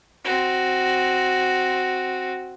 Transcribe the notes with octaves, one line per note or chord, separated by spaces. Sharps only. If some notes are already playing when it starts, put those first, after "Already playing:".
C4 F#4